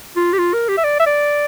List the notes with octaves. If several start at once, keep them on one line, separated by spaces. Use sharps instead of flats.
F4
G4
F4
A#4
G4
E5
D5
E5
D5